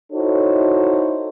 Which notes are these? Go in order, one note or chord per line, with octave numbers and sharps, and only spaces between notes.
D#4 E4 F#4 A4 C5 C#5